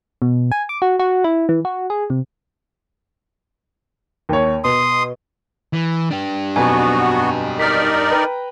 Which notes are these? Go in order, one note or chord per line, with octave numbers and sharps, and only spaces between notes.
B2
G#5
D6
F#4
F#4
E4
E3
F#4
G#4
C3
D#2 C#5
B2 C6 D#6
E3
D4 G4
B1 F2 B2 B3 F#4 G#5
D#4 A#4 D5 F6 B6
B4 G5 A#5